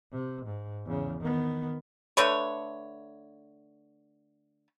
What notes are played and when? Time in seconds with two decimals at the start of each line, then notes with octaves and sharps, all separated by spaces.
0.12 C3
0.46 G#2
0.85 E2 C#3
1.21 D#3 B3
2.17 D3 A3 B4 C#5